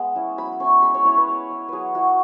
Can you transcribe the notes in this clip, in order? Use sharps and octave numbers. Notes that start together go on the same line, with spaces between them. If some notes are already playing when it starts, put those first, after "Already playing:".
Already playing: G#3 B3 B5
C#4 E4
F#3 B5
C#4 E4 C#6
G#3 B5
C#5
C#4 E4 C#5
B4
G#3
C#4 E4
F#3 G#4 B4
E4 F#4